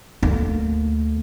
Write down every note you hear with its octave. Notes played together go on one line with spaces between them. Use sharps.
D2 A#3